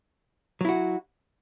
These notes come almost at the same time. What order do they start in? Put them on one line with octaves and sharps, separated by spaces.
F#3 E4 F#4